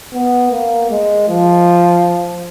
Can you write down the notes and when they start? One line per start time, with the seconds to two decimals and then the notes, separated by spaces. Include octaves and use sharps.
0.13 B3
0.52 A#3
0.90 G#3
1.28 F3